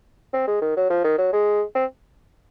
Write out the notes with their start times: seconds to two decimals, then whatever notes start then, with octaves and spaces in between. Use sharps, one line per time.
0.33 C4
0.47 G#3
0.62 D#3
0.76 F#3
0.90 F3
1.04 D#3
1.18 F#3
1.33 G#3
1.75 C4